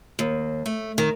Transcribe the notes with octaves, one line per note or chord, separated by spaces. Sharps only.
D#2
A3
D#3